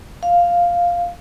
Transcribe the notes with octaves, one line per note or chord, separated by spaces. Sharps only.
F5